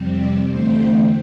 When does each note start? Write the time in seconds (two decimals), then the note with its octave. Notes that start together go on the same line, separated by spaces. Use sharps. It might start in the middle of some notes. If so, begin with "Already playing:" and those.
Already playing: F2 C3 G3 C4
0.16 D5
0.48 E2 D3 A3 C4 C5